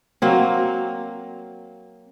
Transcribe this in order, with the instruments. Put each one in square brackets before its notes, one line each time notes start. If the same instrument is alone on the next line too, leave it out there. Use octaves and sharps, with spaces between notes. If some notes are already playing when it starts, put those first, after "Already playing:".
[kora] F#3 A#3 C4